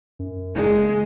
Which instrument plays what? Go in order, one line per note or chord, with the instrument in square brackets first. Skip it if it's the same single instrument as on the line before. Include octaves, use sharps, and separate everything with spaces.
[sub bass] F#2
[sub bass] F#1 [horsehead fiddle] G#3